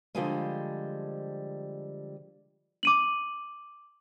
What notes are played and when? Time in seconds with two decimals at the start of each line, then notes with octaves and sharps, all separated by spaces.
0.15 D3 F3 G3 G#3
2.83 D6 D#7 F#7